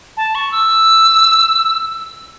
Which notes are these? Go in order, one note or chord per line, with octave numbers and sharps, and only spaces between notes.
A5
C#6
E6